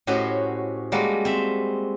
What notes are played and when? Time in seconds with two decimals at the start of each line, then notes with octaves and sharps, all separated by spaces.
0.07 A2 C#4 F#4 G4 C5 D#5
0.92 G3 G#3 A#3 F#4 A4
1.25 C4 E5